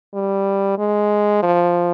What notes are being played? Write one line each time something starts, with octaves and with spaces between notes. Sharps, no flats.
G3
G#3
F3